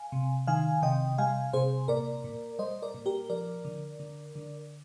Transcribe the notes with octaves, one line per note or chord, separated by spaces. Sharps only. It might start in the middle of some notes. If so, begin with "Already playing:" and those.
Already playing: F5 G#5
C3
D#3 F5 G#5
C3 D#5 G5
G3 F5 G#5
C3 G#4 C5
A#2 A#4 D5
A#2
G3 C5 D#5
A#4 D5
A#2
G4 A#4
F3 A#4 D5
D3
D3
D3